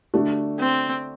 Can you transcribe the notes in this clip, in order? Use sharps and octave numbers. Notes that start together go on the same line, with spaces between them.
D3 A3 D4 F#4
C4